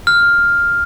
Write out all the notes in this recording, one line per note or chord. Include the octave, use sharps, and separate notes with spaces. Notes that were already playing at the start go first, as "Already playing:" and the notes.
F6